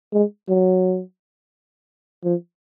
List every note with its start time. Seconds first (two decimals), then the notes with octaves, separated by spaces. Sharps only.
0.13 G#3
0.49 F#3
2.24 F3